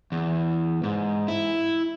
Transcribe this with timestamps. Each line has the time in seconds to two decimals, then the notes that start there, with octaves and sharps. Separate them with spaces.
0.12 E2
0.84 G#2
1.28 E4